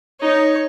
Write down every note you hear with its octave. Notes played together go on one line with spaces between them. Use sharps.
D#4 C#5